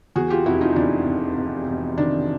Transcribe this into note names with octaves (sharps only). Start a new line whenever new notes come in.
E2 F#4 G#4
F4 G4
F1 E4 F#4
D#4 F4
D#4
E2 D4 E4
F1
F1
F1
D#3 D4